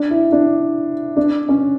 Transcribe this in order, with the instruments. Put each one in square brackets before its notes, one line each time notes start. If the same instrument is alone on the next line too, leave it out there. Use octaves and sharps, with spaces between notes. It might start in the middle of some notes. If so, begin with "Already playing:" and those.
Already playing: [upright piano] D4
E4
D4
D4
C#4